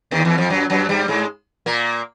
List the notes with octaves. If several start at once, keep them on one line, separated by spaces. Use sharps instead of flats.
D#2 D#3
E2 E3
F2 F3
F#2 F#3
F#2 F#3
G2 G3
G#2 G#3
A#2 A#3